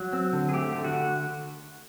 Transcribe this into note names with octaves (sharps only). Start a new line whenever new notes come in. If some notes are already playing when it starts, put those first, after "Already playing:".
Already playing: F#3
C4
D3
G#4
A3 G4
D3
F#4